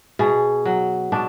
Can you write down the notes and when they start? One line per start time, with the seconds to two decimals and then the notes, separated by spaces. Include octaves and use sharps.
0.19 B2 G#4
0.65 F#3
1.12 B2 D4